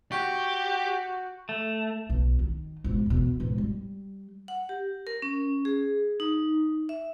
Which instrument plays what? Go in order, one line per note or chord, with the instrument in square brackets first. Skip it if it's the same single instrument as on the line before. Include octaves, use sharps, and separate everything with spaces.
[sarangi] F#4 [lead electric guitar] G4 [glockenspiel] C#6 G6
[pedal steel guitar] A3
[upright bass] B1
D#3
G#2 B2
E2 B2
B1 G#2
G3
[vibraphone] F#5
G4
A#4
C#4
G#4
D#4
E5